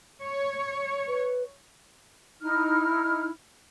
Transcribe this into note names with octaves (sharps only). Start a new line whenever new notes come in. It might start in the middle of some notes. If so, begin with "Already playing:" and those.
C#5
B4
D#4 E4 F6